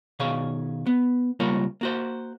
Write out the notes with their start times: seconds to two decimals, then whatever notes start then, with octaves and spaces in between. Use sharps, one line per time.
0.19 B2 D#3 G#4 C#5 F5
0.87 B3
1.40 C#2 G3 A#3 F4 A#4 C#5
1.81 A#3 F#4 C5